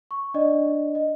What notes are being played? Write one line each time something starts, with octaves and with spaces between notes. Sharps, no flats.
C#6
D4 D5 D#5
D#5